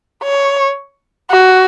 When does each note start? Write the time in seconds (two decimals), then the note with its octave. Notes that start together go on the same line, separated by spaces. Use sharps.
0.23 C#5
1.31 F#4